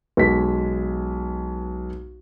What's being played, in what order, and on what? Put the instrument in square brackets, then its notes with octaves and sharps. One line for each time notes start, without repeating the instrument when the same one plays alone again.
[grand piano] B1 G#3 B6